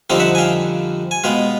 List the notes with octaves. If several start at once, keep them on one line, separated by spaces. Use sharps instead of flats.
F2 D3 G3 C4 D#4 F5 G5
E5 F#5
G#5
F5 G5
G#5
B2 G#3 B3 F5 G5